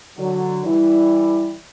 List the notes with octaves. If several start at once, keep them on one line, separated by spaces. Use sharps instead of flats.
D3 F#3
E3 G3